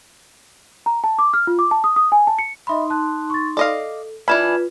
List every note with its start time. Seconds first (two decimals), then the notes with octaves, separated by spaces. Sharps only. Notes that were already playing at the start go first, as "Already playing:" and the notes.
0.86 A#5
1.04 A5
1.19 D6
1.34 F6
1.47 F4
1.59 D6
1.71 A5
1.84 D#6
1.96 D#6
2.12 G#5
2.27 A5
2.39 C#7
2.67 D#4 D#5 E5 B5 C6
2.90 A5 F#6
3.30 C#6 A6
3.57 A4 D5 D#5 F5
4.28 E3 D4 F4 B4 B5 F6 G#6 E7